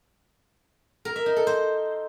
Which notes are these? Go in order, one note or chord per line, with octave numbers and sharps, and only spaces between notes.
A#4
E5
D#4
A4
C5